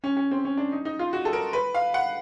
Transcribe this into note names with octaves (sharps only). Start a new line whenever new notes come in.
C#4
C#4
C4
C#4
D4
D#4
D#4
F4
F#4
A4
A#4
B4
F5
F#5